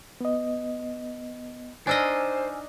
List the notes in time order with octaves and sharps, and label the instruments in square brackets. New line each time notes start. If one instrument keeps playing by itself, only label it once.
[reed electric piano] B3 D#5
[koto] D4 D#4 D#5 [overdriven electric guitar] C5 [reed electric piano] G#5 E6 F6